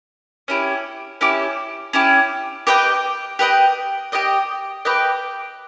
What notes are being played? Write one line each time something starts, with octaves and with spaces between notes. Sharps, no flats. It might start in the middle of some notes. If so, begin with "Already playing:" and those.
C#4 E4 G4
C#4 E4 G4
C#4 E4 G4
G4 B4 D#5 G5
G4 B4 D#5 G5
G4 B4 D#5 G5
G4 B4 D#5 G5